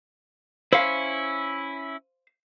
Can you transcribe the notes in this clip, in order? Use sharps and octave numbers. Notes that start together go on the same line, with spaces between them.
C#4 E4 C5 F5